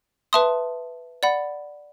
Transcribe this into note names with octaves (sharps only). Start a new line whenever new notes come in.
B4 E5 A5 C6 D#6
D5 F#5 B5